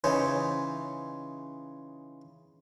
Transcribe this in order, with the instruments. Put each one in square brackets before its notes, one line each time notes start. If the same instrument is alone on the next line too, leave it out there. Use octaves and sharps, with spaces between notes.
[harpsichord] C#3 E3 D#4 C5 C#5